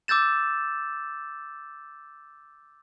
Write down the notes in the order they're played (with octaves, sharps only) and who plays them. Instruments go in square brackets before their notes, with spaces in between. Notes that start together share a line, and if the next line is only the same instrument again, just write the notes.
[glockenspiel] D6 E6 G6 A6 E7